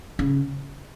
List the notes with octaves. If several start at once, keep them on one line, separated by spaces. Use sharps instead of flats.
C#3